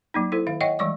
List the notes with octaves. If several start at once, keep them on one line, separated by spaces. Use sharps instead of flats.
F#3 A#3 D#4
E4 A4 C5
D#3 E5 F5
C#5 D#5 E5 F#5 G5 C#6
E3 G3 G#3 D5 C#6 D6